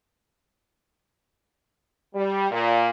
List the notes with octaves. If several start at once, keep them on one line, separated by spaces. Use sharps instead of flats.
G3
A#2